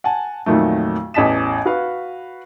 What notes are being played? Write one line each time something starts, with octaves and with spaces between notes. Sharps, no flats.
F#5 G#5 A5
F2 A#2 D#3 F#3 A3
A1 E2 D#5 A5 B6 E7
F#4 B4 F5